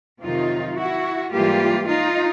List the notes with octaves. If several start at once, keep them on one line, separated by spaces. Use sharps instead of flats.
F2 C3 D#3 F#3 D#4 F4
E4 F#4
G#2 E3 G3 A#3 F4 G4
D#4 F4